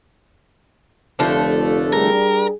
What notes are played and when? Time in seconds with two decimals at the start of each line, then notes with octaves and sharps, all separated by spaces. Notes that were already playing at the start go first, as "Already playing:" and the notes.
1.19 F1 D3 F3 A3
1.93 G3 D4 G#4 A#4